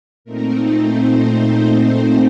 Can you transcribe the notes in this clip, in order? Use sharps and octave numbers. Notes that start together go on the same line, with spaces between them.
A#2 A3 C4 D#4 A#4
C5
C5